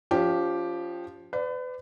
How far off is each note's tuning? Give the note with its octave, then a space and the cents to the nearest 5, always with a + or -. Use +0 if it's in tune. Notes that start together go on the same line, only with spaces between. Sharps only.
F3 +0 C#4 +35 G4 +0
B4 +35 D5 +0